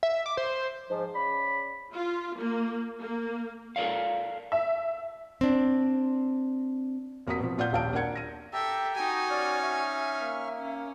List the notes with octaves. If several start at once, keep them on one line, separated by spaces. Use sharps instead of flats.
E5
D6
C5
G#2 F3
C#3 D5 B5
F4
A#3
A#3
A4 A#4 C5 D5 F5
E5
C4 D4
F1 A#3 F#4 A#5 D#6 B6
B2 F3
A#2 F4 D5 F#5 G6
D#1 A#1 F5 A5 D7
A#3 D4 A#4 F#5 G#6 C#7
A#6 D#7
G4 A4 E5 G5 A5 A#5
D#4 F#4 G#5
C#4 D5 C#6 F6
E5
A#3
C#4